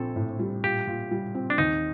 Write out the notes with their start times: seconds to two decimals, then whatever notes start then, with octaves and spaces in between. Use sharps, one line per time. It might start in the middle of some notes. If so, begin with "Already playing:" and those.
Already playing: A#1 C4 A4
0.16 A2
0.39 G3
0.64 A#2 G4
0.87 A#2
1.11 G3
1.35 C4
1.50 D4
1.58 D#2 D#4